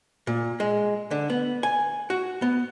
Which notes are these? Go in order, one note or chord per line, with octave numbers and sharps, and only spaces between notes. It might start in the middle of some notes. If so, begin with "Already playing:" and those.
A#2
G#3
D3
B3
G#5
F#4
B3